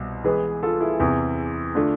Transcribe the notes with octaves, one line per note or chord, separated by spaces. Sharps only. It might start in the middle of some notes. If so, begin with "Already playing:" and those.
Already playing: C2 B2
E3 G#3 B3 G#4 B4
F4 A4
E4 G#4
E2 C3 E3
D3 A3 D4 F4